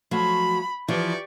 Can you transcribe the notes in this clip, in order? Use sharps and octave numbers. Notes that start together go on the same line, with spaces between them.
F3 F#3 A3 B5
E3 F3 F4 G4 D5 C#6